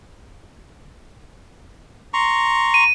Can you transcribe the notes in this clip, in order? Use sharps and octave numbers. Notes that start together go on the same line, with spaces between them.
A#5 C6 C#6
D#7